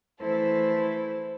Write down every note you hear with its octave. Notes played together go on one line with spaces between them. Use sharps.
E3 A3 E4 A4 C5